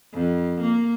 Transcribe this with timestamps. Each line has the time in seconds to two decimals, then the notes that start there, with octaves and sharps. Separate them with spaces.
0.14 F2
0.61 A#3